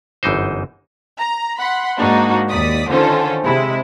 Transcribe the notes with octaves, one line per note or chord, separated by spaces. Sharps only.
G1 F#2 E3 D#4 C5
A#5
F#5 B5 C6
G#2 A#3 D4 D#4 F#4
D#2 D5 D#6 B6
D3 D#3 C#4 F4 A4 C5
C3 G#3 E4